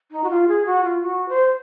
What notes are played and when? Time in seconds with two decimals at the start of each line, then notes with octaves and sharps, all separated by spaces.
0.11 D#4
0.23 F#4
0.29 F4
0.48 G#4
0.65 F#4
0.83 F4
1.01 F#4
1.28 C5